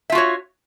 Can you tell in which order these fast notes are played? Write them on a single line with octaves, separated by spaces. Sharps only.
E5 F4 F#4 C#5